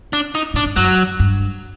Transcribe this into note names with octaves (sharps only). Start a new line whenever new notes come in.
D4
D#4
A2 D4
G2
F#2 F#3
G2